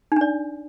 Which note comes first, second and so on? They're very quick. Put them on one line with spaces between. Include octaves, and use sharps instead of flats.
D#4 D4 D5